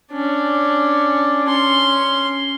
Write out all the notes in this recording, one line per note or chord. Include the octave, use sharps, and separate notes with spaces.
C#4 D4
C#4 C6